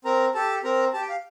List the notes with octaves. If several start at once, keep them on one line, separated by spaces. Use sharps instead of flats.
C4 A#4 A#5
G4 A4 A5
C4 A#4 A#5
G4 A5
G5
F5